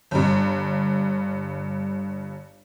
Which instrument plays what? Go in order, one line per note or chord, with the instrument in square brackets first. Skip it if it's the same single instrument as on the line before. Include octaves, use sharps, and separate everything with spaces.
[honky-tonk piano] G1 G2